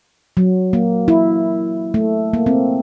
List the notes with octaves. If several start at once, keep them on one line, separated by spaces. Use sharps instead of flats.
F#3
A#3
E4
A3
A#3
C4